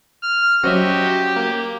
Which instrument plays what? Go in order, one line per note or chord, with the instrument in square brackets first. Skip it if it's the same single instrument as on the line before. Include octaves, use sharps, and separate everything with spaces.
[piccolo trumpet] F6
[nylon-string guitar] F#3 C#4 C5 [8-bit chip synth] F#4 D#5 E5 [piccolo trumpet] G4
[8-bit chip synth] A#3